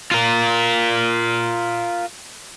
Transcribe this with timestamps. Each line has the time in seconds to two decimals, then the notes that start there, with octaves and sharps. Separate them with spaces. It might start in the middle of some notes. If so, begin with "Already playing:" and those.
0.11 F4 A#4